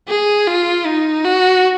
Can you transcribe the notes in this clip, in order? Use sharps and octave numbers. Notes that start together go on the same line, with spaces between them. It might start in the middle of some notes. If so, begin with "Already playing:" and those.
G#4
F4
D#4
F#4